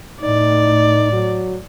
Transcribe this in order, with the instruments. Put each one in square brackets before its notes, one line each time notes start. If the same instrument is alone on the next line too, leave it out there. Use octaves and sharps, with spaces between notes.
[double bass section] A2 [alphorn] D#4 [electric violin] D5
[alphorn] F#3